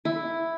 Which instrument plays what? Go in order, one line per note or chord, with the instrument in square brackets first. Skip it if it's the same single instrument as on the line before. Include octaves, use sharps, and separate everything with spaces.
[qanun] E4